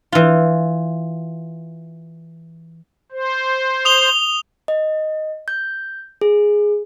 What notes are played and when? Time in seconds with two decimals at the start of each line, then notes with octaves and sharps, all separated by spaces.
0.12 E3 F4
3.12 C5
3.85 D#6 F7 G7
4.68 D#5
5.48 G6
6.21 G#4